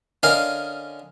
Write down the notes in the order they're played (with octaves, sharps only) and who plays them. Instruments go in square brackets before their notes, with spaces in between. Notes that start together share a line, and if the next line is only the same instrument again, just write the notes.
[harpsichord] D3 C#4 A#4 D#5 F5